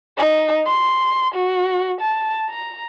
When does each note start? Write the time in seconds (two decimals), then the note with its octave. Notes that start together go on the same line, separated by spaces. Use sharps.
0.17 D#4
0.67 C6
1.34 F#4
2.01 A5
2.49 A#5